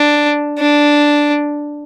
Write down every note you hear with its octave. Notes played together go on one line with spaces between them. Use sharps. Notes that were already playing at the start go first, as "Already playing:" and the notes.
Already playing: D4
D4